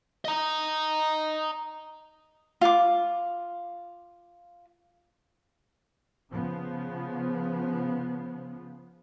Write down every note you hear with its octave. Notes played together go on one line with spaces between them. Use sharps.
D#5 A#5
F4 D6
C#3 F3 B3